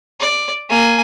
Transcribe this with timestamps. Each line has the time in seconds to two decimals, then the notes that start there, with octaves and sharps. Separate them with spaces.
0.20 D5
0.69 A#3 G#5